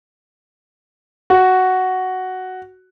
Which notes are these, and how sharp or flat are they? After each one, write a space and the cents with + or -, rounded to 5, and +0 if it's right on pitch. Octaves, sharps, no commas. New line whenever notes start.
F#4 +5